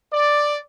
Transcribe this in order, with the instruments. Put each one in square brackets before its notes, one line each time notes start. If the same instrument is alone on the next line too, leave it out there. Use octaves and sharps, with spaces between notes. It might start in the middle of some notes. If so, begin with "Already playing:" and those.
[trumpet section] D5